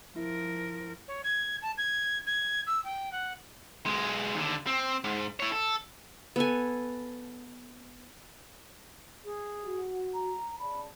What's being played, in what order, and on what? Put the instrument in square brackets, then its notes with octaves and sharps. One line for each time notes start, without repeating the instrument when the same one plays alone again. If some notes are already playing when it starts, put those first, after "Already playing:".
[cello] F3 A#4 [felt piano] E4
[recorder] C#5
G#6
A5
G#6
G#6
E6
G5
F#5
[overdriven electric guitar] B1 G#3
D#2 D3
C4
G#2
E4 C#5
A4
[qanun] B3 A4 G#5
[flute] G#4
[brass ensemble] F#4
[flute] A#5
[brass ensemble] C#3 D5 A5 [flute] B5